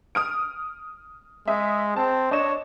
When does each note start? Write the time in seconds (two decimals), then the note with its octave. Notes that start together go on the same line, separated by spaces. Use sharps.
0.15 D#6 F6 D7
1.48 G#3 E5 D#6
1.96 C4 A5
2.31 D4 C#5 D#5 E7